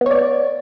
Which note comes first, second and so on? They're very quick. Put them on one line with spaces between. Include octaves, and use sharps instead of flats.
B3 C#5 D5